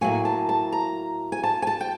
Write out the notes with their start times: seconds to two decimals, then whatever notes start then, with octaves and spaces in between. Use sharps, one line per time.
0.01 A2 F#3 A#3 G#5
0.25 A5
0.49 A5
0.72 A#5
1.32 G#5
1.43 A5
1.62 G#5
1.67 A5
1.81 G5